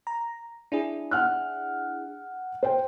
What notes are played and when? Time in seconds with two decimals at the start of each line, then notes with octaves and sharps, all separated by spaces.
0.07 A#5
0.72 D4 E4 G#4
1.11 F#5 F6 F#6
2.63 C5 G5